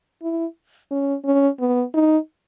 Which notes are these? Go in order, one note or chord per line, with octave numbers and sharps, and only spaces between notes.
E4
C#4
C#4
B3
D#4